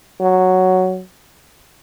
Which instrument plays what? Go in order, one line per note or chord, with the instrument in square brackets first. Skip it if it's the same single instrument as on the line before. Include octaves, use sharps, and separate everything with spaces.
[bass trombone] F#3